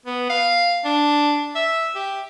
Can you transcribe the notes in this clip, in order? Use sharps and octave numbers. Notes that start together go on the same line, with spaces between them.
B3
F5
D4
E5
G4